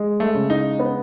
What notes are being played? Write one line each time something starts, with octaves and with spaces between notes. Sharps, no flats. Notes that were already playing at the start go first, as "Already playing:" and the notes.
Already playing: G#3
A3
C#3
D#4
B3